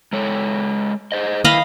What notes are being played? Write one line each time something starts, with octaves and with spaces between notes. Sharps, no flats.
G#3 A4 C#5
G#4 C5 D#5
D#3 E4 D#5 F5 B5